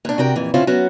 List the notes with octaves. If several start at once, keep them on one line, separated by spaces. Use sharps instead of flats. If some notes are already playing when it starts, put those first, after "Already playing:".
A#2 D4
C3 D4 F#4 A#4 G5
F2 A#2 E3
A2 D3 C4 C#4 E4 F4
F#3 B3 C#4 F#4